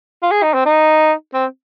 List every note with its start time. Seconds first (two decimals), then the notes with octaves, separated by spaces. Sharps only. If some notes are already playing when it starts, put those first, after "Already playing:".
0.23 F4
0.32 G#4
0.43 D#4
0.54 C4
0.66 D#4
1.34 C4